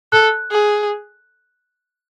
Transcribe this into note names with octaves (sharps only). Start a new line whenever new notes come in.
A4 F#6
G#4